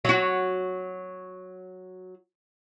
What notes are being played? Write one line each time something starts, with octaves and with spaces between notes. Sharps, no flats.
F#3 F#4